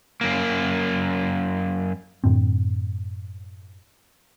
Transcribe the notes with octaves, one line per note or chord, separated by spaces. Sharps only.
F#2 A#3
F#2 A2 D3 C4